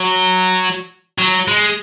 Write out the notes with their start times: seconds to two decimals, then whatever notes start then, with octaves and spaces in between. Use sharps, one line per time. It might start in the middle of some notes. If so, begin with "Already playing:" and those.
Already playing: F#3
1.19 F#3
1.48 G#3